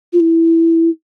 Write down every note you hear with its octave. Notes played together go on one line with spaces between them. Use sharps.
F4
E4